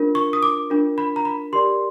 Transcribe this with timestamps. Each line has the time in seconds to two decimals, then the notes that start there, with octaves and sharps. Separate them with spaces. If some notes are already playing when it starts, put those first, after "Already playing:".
Already playing: D4 F4 A#4
0.15 C#6
0.33 D#6
0.43 D6
0.70 D4 F4 A#4
0.98 B5
1.16 A#5
1.25 B5
1.53 G4 A#4 D5 C6